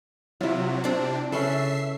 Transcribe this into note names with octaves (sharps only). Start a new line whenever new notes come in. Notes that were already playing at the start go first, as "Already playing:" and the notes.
C3 F#3 E4 F4
C3 C4 D4 A5
C#3 C#4 A4 B4 E5 C7